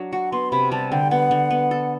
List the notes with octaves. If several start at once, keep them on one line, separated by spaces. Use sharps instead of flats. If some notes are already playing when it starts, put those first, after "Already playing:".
Already playing: F#3 D4
F#4 F#5
B3 C6
C3 B5
G3 A5
D3 G5
B3 F#5
D3
B3
A4